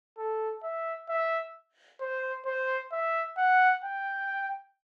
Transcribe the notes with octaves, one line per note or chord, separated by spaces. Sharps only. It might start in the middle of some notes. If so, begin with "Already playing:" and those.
A4
E5
E5
C5
C5
E5
F#5
G5